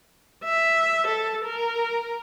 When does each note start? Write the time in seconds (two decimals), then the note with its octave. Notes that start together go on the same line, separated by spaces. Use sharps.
0.44 E5
1.07 A4
1.45 A#4